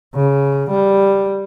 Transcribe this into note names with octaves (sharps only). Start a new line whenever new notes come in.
C#3
G3